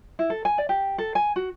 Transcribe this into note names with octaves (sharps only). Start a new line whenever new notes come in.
E4
A4
G#5
D5
G4
A4
G#5
F#4